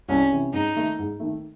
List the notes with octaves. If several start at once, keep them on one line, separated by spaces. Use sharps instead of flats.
C2 C#4
C3 E3
G#2 D#4
D#3 A3
G#2
D#3 A3